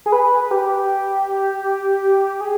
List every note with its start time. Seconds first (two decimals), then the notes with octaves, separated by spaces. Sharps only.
0.06 G#4
0.12 B4
0.51 G4
2.41 G#4